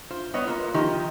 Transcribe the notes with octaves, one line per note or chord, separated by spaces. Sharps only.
F4 C5
G3 B3 C#5 D#5
A#3 C4 F4 B4
D#3 F3 D#4 G4